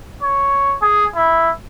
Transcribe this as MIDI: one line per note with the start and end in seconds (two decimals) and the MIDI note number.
0.22 0.75 73
0.82 1.06 68
1.16 1.51 64